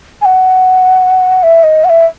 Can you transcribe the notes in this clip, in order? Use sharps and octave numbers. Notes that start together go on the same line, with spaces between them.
G#5
F#5
E5
D#5
F#5
E5